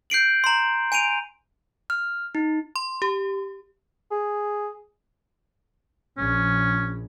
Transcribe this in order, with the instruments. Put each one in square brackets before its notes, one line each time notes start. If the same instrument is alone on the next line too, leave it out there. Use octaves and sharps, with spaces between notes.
[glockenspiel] G6 C7 D7 F#7
A#5 C6
G#5 D7 D#7 F7
[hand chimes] F6
D#4
[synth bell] C6
G4
[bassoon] G#4
[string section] A#1 [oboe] C#4